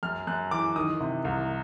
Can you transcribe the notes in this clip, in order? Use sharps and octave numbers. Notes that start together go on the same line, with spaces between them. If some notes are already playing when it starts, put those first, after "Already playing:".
F#2 F6
F#2 F#6
E3 D6
D#3 D#6
C3
C2